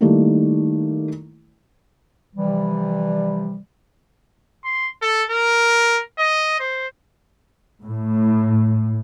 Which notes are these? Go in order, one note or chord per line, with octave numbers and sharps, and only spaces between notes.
D#3 G3 A3 A#3 D#4 E4
C3 E3 F3 G3
C6
A4
A#4
D#5
C5
A2